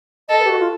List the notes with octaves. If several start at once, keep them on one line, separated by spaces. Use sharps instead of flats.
A4 D#5
B4
G4
F#4
F4